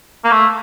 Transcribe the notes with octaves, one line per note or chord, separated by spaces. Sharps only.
A#3
A3